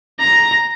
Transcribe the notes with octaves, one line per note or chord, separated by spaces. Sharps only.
A#5